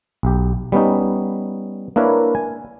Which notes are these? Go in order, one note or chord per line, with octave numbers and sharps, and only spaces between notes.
B1 G4
G3 B3 C#4 D#4
A#3 D4 E4 A#4 B4 C#5
G#5